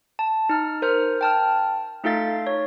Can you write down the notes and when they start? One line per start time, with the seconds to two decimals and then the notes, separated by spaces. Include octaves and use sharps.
0.19 A5
0.49 D#4 F6
0.82 A#4 C5 F6
1.21 G5 A5 F6
2.04 A3 D#4 F4 A4 F5 A6
2.47 C#5